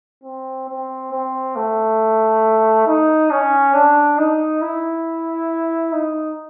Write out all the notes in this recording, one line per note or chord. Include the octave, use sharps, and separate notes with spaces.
C4
C4
C4
A3
D#4
C#4
D4
D#4
E4
D#4